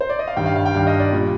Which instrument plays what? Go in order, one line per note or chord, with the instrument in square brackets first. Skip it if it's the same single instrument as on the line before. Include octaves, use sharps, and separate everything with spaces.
[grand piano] C5
D5
D#5
F5
G2 D#3 G3 G5
F5
F5
G5
G2 D#3 G3 F5
D#5
D5
A#2 G3